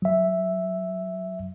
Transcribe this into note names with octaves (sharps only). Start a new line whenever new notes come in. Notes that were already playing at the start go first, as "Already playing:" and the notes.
F#3 E5